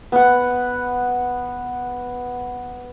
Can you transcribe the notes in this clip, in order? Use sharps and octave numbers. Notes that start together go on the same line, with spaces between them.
B3 F#5